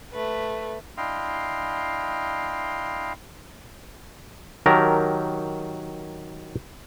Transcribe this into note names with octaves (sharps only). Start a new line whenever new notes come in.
A3 B4
D4 E4 D#5 F5 G5 C6
D#3 F#3 G4 A#4 A5 A#5